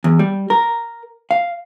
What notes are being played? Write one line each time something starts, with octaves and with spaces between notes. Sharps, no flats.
E2
G3
A#4
F5